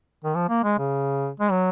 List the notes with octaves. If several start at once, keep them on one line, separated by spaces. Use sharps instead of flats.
D#3
F3
A#3
G#3
C#3
G#3
F#3